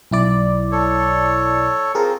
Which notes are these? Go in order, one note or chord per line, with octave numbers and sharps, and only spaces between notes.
B1 E4 D5
A4 C#5
C4 F4 G#4 A#4